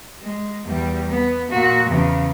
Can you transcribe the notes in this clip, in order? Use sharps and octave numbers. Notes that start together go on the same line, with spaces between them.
G#3
E2 G3
B3
A#2 F#4
E2 C#3